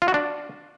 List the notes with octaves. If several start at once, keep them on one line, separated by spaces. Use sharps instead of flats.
F4
F#4
D4